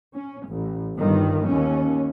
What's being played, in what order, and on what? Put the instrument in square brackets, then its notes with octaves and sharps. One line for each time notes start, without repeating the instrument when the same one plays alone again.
[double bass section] C#4
A1
G1 G2 D#3
D#2 C#4